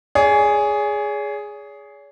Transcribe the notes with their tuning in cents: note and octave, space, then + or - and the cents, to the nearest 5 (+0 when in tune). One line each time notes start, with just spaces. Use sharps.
G#4 +0 C#5 +45